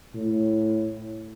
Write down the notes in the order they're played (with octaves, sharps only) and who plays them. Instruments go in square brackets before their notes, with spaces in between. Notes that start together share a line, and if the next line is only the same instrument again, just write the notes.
[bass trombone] A2